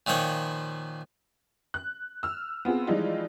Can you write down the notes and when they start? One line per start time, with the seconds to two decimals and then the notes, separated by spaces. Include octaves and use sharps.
0.07 A#2 D#3 F3 C#5
1.74 F#6
2.23 E6 F6
2.65 B3 C4 F4 G#4
2.87 E3 F3 G3 G#3 D#4 F4